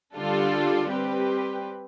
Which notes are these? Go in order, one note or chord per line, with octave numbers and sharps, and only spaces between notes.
D3 G3 D4 F4 A4
G3 C4 G4 B4